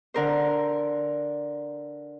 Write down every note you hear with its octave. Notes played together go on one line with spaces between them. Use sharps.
D3 A#4 C5